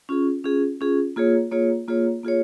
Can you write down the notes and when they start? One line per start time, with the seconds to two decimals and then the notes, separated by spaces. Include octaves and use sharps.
0.09 C#4 F4 G#4
0.44 C#4 F4 G#4
0.81 C#4 F4 G#4
1.16 A#3 F4 G#4 C#5
1.51 A#3 F4 G#4 C#5
1.88 A#3 F4 G#4 C#5
2.23 A#3 F4 G#4 C#5